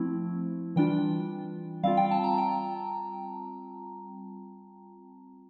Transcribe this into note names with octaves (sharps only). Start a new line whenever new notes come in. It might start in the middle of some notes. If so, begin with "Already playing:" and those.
Already playing: F3 A3 C4 E4
E3 G3 D4 F4 G5
G3 C4 F4 F5
G5
A5
A#5
G5